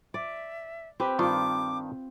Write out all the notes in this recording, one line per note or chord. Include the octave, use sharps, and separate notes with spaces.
D5 E5
C4 G4 B4
G2 D#3 F4 D6